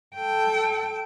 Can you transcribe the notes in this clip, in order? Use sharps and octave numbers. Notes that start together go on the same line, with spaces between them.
A4 G5